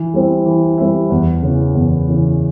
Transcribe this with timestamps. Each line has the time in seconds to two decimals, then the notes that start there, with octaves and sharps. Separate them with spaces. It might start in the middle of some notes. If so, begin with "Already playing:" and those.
Already playing: E3
0.14 G3 C4 E4
0.46 E3
0.78 G3 C4 E4
1.10 E2
1.43 C#3 E3
1.75 E2
2.07 C#3 E3